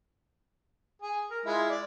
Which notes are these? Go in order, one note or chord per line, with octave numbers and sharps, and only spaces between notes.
G#4
A#4
G#3 E4 F4
D5